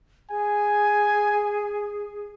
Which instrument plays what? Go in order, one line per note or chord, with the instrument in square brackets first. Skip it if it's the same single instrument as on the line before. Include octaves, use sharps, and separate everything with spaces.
[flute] G#4 [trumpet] G#5